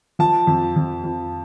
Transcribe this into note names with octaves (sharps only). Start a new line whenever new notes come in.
F3 A5
F2
F2
F2